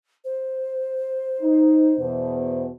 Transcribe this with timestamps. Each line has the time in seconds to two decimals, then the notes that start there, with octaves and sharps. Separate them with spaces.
0.25 C5
1.40 D#4
1.97 E2 B2 B3